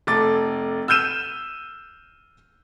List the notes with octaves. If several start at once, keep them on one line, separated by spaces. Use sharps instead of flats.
F1 A3 D6 A6
E6 F6 G6 D#7 E7